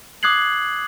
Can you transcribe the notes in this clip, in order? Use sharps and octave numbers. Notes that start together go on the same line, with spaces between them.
D6 D#6 F#6 G#6 C7 F#7